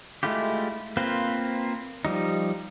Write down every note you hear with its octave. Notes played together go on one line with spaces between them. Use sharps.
G#3 A3 E4 F4 G4
A#3 C4 F4 B4 C5
F3 G3 D#4